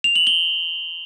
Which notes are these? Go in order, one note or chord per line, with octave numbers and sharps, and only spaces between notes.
F7
F#7
G7